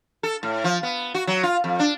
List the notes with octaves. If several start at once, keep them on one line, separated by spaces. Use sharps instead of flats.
A4
A2
F3
B3
F#4
F#3
F4
F2
D4